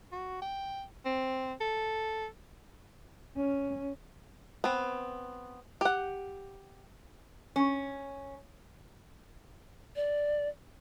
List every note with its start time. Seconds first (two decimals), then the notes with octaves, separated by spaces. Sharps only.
0.12 F#4
0.42 G5
1.05 C4
1.61 A4
3.36 C#4
4.64 B3 C4
5.81 G4 F#5
7.56 C#4
9.96 D5